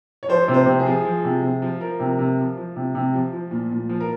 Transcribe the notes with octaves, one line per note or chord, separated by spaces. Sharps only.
C#5
F3 C5
C3
C5
C3
G#4
F3
F3
C3
C3
F3
F3 A#4
C3
C3
F3
F3
C3
C3
F3
F3
A#2
A#2
F3
A#4